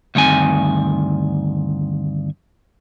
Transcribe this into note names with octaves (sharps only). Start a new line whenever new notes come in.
D2 G2 D#3 C4 G#5